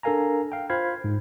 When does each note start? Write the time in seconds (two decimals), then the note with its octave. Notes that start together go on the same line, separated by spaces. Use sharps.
0.03 D4 A4 A#4 F5 G#5 A#5
0.52 F5 G5
0.70 F4 C5 F5 B5 G#6
1.04 G#2